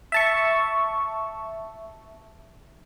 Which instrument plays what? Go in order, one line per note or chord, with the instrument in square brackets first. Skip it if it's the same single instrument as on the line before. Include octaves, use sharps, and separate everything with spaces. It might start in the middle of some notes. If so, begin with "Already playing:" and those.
[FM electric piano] E5 A5 C#6